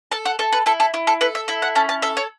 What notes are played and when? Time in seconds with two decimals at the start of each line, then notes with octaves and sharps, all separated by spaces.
0.12 A4 A5
0.25 F#5
0.39 A4 E5
0.52 B4
0.66 E4 A4
0.80 A4
0.94 E4
1.07 A4
1.21 A4 B4
1.35 E5
1.48 E4 E5
1.62 F#5
1.75 C#4 A5
1.89 A5
2.02 A4 E5
2.17 C#5